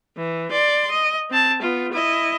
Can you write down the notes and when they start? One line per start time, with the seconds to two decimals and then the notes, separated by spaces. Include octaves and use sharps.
0.17 E3
0.51 D5 C6
0.91 D#5
1.30 C4 A5
1.62 B3 F4
1.92 E4 D#5